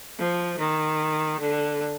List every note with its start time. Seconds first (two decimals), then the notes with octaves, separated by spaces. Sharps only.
0.18 F3
0.59 D#3
1.40 D3